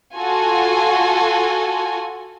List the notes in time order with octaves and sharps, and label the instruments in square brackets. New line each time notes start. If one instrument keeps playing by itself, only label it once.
[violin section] F4 F#4 A4 G#5